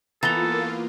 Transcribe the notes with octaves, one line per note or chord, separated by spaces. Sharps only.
E3 A#3 B3 F4 A4 A#5 A6 G7